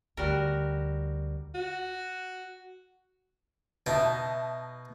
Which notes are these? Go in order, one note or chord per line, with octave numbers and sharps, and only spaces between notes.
D2 G3 F#4 A#4
F#4
B2 D#4 E5 A5 D#6